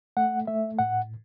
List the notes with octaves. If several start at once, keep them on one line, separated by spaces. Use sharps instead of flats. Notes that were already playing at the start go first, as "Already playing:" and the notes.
A3 F#5
A3 E5
A2 F#5